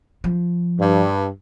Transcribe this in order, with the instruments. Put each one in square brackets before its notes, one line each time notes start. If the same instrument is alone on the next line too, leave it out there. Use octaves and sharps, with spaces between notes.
[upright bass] F3
[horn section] G2